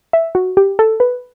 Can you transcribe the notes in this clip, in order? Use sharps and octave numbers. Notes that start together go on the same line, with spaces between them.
E5
F#4
G4
A4
B4